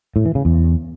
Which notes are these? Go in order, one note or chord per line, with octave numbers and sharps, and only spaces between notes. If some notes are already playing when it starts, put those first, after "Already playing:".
A2
E3
C#3
E2